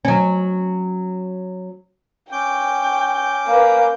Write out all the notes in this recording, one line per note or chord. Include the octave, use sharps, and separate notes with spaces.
F#3 C#4
C#4 G5 D6 G6
A#3 B4